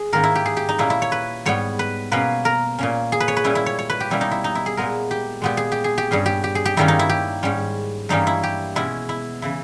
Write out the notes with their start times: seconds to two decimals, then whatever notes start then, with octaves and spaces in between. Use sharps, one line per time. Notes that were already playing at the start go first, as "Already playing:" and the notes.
Already playing: G#4
0.13 G#2 D#3 A#3 C#4 A#4
0.23 E4
0.35 G4
0.46 G#4
0.57 G4
0.69 D#4
0.78 A#2 A#3 C#4 E4
0.90 E4
1.02 C#5
1.12 B4
1.46 G#2 G3 B3 C#5
1.79 B4
2.12 B2 A#3 C#4 B4
2.45 A#4
2.79 A#2 A#3 C#4
3.12 G#4
3.20 B4
3.28 C#5
3.37 B4
3.44 A#2 G3 C#4 E4
3.55 E4
3.66 C#5
3.79 C#5
3.90 B4
4.00 G4
4.10 B2 G3 A#3 C#4 E4
4.21 D#4
4.31 E4
4.44 D#4
4.55 E4
4.66 G#4
4.77 A#2 G#3 B3 A#4
5.11 G4
5.42 A#2 G#3 B3 G4
5.57 G#4
5.72 G4
5.84 G#4
5.98 G4
6.11 G2 G3 C#4 G#4
6.26 G4
6.44 G4
6.55 G#4
6.65 G4
6.77 G2 D#3 G3 A#3 C#4 E4
6.88 D#4
6.99 E4
7.09 G4
7.43 G#2 G3 C#4
8.09 G2 E3 G3 A#3 C#4 D#4
8.27 E4
8.44 G4
8.76 B2 G#3 C#4 E4
9.09 E4
9.42 C#3 E3 E4